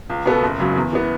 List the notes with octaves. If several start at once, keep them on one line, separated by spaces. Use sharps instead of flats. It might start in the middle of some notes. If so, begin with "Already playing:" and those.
C#2
B2 B3 A4
F#1
F#2 C#3 F#3
E2
E3 B3